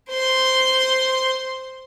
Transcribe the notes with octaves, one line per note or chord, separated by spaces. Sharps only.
C5 C6